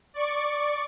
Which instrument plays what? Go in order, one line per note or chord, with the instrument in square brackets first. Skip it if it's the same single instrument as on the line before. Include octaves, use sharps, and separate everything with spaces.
[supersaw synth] D5 C#6 D6